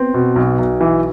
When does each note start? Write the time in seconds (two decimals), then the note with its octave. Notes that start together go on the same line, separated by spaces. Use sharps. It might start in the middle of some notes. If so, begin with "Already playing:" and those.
Already playing: B3 C4
0.14 B2
0.36 B1
0.59 B1
0.81 E3